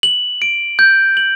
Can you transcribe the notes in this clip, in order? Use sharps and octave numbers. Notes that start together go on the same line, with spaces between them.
F#7
D7
G6
F#7